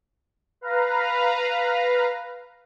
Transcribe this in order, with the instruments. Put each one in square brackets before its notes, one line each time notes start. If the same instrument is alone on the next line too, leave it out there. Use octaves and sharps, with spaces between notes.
[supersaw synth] B4 F5 A#5